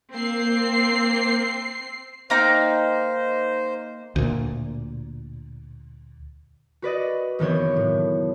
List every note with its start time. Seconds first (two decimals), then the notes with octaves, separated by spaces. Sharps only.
0.14 A#3 C4 C7
2.30 A#3 D#4 C5 G5
4.16 D2 A#2
6.82 F#4 B4 D5 D#5
7.39 F#1 D#3 E3 B3 C4 C#5
7.76 A2